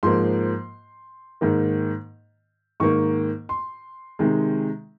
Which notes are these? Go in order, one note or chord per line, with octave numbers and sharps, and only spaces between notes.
G#2 F3 A#3 C6
G#2 D#3 A#3
G#2 D#3 A#3 C#6
C6
C3 D#3 G#3